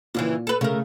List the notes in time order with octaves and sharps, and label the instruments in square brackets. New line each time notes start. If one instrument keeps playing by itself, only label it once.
[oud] D#2 C#3 E3 [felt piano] A#2
[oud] A4 B4
[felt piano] C#3 [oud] A3 A#4